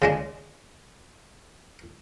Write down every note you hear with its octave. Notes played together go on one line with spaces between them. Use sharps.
C#3 G#3 D4